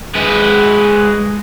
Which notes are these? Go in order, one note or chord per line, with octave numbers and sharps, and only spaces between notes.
G#3 B4